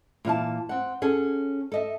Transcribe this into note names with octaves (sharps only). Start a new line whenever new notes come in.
A#2 E3 F5 A5
C4 F#5
C#4 G#4 A4
A4 D#5 E5